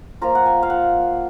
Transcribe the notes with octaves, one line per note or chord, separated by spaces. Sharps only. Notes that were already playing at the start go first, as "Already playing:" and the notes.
F3 A#3 F4 A#5
F#5
G#5
F5
F#5